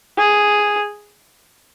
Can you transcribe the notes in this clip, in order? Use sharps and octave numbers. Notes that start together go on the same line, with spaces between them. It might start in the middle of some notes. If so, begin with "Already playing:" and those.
G#4